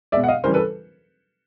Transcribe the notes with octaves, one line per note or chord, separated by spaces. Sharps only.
B2 G#3 D5 E5
F#5
D#5 F5
C#3 E3 G3 A#4 C5
A4 B4